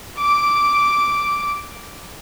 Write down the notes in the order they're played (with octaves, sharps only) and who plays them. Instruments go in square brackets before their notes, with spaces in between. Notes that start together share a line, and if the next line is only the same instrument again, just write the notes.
[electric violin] D6 D7